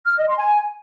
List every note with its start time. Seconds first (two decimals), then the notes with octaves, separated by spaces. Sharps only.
0.04 F6
0.16 D#5
0.27 C6
0.38 G#5